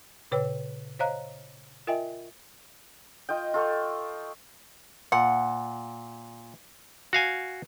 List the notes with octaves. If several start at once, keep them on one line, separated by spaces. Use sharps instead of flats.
A#2 C#3 B4 C#5 G5 E6
C5 C#5 D#5 F5 A#5 F#6
F4 A#4 D#5 E5 G5 G#5
F4 D#5 G5
F4 A4 C#6
A#2 F#5
F#4 F5 G#5